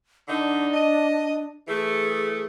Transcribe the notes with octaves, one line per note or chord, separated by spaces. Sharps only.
D3 D4 D#4
D#5
E3 A3 G#4